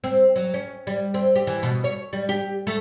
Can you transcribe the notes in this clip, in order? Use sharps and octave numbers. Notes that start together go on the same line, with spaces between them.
C4
F#3
C#4
G3
C4
G4
E3
B2
C#5
G3
G4
A3